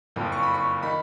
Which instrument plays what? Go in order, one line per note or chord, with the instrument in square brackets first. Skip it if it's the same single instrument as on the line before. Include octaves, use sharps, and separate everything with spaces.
[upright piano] F#1 F2 F3
C#6
B5
C#6
D#3 B5